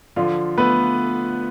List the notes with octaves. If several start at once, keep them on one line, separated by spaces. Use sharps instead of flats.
D3 F3 F4
A3 B3 B4